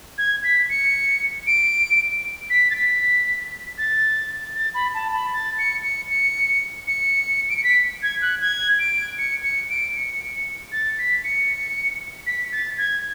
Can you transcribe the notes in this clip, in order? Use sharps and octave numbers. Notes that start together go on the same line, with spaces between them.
G#6
B6
C#7
D7
B6
A6
B6
A6
A6
B5
A5
B5
A6
C#7
C#7
C#7
C#7
D7
C#7
B6
G#6
F#6
G#6
D7
C#7
C#7
D7
C#7
A6
B6
C#7
B6
A6
G#6